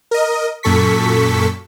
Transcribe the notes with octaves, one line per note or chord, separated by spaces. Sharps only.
A#4 D#5
F#2 A#2 A4 C#6 B6